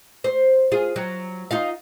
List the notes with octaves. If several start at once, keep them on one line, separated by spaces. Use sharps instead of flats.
C5
F4 G#4
F#3
D#4 F4 F5